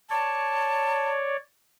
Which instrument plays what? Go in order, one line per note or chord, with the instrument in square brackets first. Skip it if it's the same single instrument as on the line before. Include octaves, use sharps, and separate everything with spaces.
[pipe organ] C#5 D5 [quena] A5